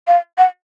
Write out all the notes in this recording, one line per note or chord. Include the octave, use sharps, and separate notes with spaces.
F5
F#5